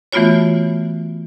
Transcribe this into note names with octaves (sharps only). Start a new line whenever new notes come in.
E3 A3 B3 F4 F#4 C#5